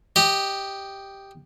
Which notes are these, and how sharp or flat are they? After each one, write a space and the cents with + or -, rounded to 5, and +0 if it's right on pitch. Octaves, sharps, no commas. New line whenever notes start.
G4 +0 D#5 -5